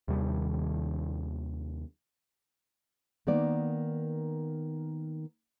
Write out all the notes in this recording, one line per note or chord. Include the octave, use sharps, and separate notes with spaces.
D#2 C3 D#3 G3
D#3 A#3 B3 D5